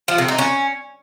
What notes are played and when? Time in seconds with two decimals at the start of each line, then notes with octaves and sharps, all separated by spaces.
0.08 F3
0.18 C3
0.28 D#4
0.38 C#4